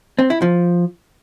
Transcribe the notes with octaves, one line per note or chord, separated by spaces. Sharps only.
C4
E4
F3